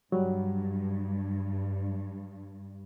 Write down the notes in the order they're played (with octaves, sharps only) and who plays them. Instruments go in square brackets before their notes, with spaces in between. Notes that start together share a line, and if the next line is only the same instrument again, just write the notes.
[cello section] G2 [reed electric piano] F#3 G3